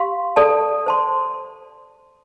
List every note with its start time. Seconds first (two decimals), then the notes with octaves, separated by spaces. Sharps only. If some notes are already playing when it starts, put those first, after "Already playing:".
Already playing: G4 F5 C6
0.36 A4 D5 A5
0.86 C5 A5 C6